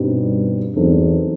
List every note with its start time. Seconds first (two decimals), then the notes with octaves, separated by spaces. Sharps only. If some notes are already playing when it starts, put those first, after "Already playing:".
Already playing: G2 B2 G3 C4 D#4 G4
0.75 E2 F#3 C4 D#4 A4